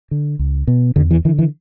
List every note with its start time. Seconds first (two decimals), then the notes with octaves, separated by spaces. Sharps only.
0.11 D3
0.39 C#2
0.67 B2
0.96 E2 D3
1.11 E3
1.25 D3 E3
1.39 E3